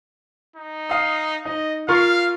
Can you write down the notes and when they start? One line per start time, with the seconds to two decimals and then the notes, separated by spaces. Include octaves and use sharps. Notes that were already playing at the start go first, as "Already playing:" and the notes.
0.56 D#4
0.90 F5 D#6
1.45 D#4 D#5
1.89 F4 A#4 F5 C#6